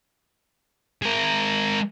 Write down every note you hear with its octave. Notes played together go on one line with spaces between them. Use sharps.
G#3 A#4